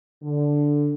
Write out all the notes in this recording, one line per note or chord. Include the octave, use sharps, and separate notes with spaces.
D3